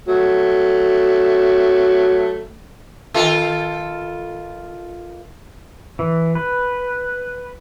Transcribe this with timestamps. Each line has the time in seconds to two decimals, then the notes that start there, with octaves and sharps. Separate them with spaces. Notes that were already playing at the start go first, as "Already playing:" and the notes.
0.08 F#3 A3
3.14 D#3 F4 A4
5.99 E3
6.35 B4